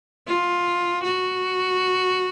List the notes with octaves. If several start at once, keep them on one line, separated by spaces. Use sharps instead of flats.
F4
F#4